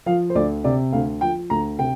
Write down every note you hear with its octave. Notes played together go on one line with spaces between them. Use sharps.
F3 F5
C5
D2 D5
C3 D5
D2 F5
F3 G5
D2 A#5
C3 G5